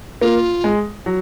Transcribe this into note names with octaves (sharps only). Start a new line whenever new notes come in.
A#3 F4
G#3
F#3